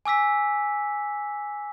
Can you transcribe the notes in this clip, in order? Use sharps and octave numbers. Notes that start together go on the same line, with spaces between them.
G#5 D6 E6 B6